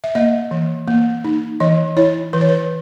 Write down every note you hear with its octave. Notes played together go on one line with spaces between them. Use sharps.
E5
A#3 D#5
E3
A#3
D#4
E3 D#5
E4 C#5
E3 B4
C#5
B4